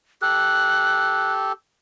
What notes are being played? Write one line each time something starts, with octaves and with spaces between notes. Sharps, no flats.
G4 A4 F#6